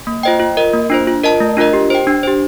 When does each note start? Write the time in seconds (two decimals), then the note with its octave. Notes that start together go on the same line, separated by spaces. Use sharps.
0.07 A#3
0.23 F4 C5 D#5 G5
0.40 F4
0.57 A#4 D#5
0.74 A#3
0.90 D4 F4 C5
1.07 F4
1.23 A#4 D#5 A5
1.40 A3
1.57 D4 F4 A#4 D#5
1.73 G4
1.90 C5 G5
2.07 D4
2.23 G4 C5